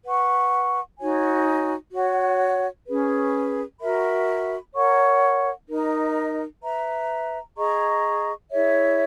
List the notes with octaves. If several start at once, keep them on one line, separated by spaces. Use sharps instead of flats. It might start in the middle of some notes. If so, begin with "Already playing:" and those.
B4 F#5 C#6
D#4 F#4 C#5 G#5
F#4 C#5 F#5
C#4 G#4 B4
F#4 A#4 E5 B5
A#4 C#5 F#5 C#6
D#4 A#4 D#5
B4 E5 A#5
G#4 D#5 A#5 C#6
E4 G#4 C#5 E5